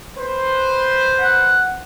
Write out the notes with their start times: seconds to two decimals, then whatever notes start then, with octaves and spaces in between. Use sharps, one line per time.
0.17 B4 C5
1.21 F#5